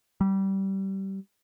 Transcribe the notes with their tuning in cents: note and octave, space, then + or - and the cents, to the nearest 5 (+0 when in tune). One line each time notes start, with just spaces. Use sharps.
G3 -20